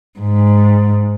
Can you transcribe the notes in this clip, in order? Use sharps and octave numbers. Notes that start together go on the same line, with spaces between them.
G#2